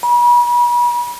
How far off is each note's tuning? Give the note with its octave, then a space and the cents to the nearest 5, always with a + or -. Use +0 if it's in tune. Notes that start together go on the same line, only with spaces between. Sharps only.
B5 -40